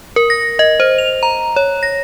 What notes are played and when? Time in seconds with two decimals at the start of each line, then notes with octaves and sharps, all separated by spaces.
0.16 A#4
0.30 A#6
0.59 D#5
0.80 C5
0.98 F7
1.23 A#5
1.56 C#5
1.83 A#6